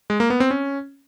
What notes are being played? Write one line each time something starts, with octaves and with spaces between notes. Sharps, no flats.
G#3
A#3
B3
C4
C#4